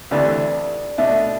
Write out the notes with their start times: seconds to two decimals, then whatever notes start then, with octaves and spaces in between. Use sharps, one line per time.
0.11 D2 C3 E3 A3 D4 D5
0.98 B2 A3 D4 E5